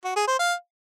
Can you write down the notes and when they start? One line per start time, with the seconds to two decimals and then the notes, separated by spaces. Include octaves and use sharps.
0.04 F#4
0.16 G#4
0.27 C5
0.39 F5